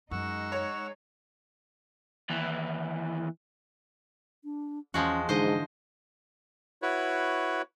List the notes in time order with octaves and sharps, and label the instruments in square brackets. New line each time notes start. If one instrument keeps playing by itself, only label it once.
[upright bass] F#2 [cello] G#3 D#4 [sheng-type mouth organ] F#5 C#6 E6
[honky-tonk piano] C#5
[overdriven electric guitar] D#2 E3
[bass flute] D4
[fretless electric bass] E2 [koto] F3 G#3 F#4 [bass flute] C#4
[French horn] G#2 [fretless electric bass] D3 E3 [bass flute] D4 [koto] C5 D#5
[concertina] E4 F#4 B4 C#5